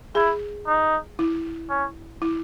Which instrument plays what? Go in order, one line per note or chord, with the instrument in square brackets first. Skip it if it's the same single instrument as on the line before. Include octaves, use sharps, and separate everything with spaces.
[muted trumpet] E4 [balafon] G#4
[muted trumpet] D#4
[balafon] E4
[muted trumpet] C#4
[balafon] E4